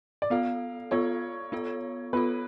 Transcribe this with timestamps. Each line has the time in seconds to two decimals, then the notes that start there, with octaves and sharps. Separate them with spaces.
0.22 D5
0.30 B3 F4 A4 F5
0.91 B3 F4 A4 C#5
1.52 B3 F4 A4
2.13 B3 F4 A4 B4